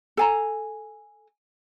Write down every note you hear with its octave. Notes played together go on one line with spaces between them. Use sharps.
A4 G#5 A#5